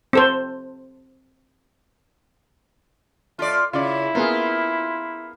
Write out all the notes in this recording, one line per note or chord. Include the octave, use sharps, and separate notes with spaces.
C4 A4 C5
A3 F4 D5
C#3 E4 F4 D5
A#3 B3 F4 G#4